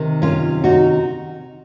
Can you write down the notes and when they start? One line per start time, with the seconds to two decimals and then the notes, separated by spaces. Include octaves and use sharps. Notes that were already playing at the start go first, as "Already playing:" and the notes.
Already playing: C3 D#3
0.22 C#4 F4
0.64 D#4 F#4